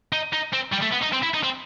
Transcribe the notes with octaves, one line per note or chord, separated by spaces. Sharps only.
D#4
D#4
C4
G3
A3
B3
D#4
C4
E4
D#4
C4